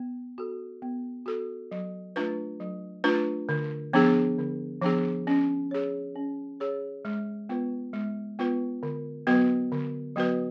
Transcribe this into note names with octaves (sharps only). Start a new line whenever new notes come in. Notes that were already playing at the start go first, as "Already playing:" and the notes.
Already playing: B3
F#4 A4
B3
F#4 A4
F#3
A3 D4 F4 B4
F#3
A3 D4 F4 B4
D3
F3 B3 D4 G#4
D3
F3 B3 D4 G#4
C#4
G#4 C#5
C#4
G#4 C#5
G#3
B3 F4 B4
G#3
B3 F4 B4
D3
F#3 B3 F#4 B4
D3
F#3 B3 F#4 B4